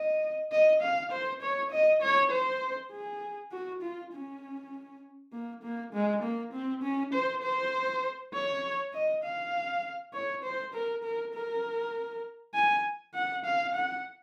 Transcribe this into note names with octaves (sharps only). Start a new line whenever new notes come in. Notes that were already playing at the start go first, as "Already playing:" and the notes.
Already playing: D#5
D#5
F5
C5
C#5
D#5
C#5
C5
G#4
F#4
F4
C#4
A#3
A#3
G#3
A#3
C4
C#4
C5
C5
C#5
D#5
F5
C#5
C5
A#4
A#4
A#4
G#5
F#5
F5
F#5